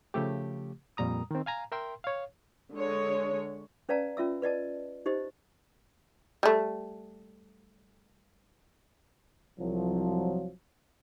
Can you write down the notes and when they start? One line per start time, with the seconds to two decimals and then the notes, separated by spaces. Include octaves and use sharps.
0.14 C#3 F3 A3 G4
0.97 F2 A#2 G3 A#5 D#6
1.31 D#3 C4
1.46 F5 G#5 A#5
1.72 A#4 E5 G5 C6
2.04 C#5 F5
2.72 D3 G#3 C#5
3.89 C#4 B4 D5 F5 A5 A#5
4.17 C#4 F4 E5 E6
4.42 B4 D5 D#5 A5
5.06 D#4 G4 C5 D#5
6.43 G3 A3
9.59 C2 F3 F#3